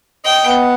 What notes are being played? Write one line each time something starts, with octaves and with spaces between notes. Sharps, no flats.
D#5 G5
B3